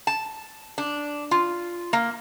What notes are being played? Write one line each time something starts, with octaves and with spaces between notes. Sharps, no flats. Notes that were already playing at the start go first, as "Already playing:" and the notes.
A5
D4
F4
A#3